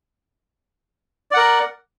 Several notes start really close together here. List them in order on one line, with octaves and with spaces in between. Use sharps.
D5 F#5 A#4